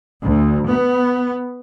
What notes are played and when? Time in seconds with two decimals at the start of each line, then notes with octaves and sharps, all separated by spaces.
0.23 D2
0.68 B3